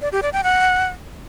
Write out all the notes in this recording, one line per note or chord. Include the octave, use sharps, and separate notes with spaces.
D5
G4
D5
G5
F#5